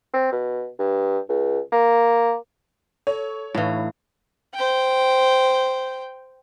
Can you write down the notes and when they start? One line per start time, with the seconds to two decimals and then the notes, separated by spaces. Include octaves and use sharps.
0.14 C4
0.32 B2
0.79 G2
1.29 C#2
1.72 A#3
3.07 A4 C#5
3.55 A2 E3 D4 D#4 F5
4.54 C5 G5